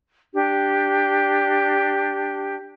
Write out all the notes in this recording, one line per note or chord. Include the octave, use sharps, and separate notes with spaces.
D4 G4